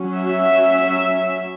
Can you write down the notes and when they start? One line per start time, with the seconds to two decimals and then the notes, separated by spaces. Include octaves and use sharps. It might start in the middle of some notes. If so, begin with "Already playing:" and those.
Already playing: F#3 C#4
0.18 E5